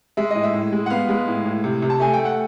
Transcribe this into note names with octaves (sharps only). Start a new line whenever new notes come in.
G#3 E5
A2 D#5
E5
A2
G#3
F#5
B3 F5
G#3
A2
A2
C3
C3
A5
A3 G#5
A3 G5
F#5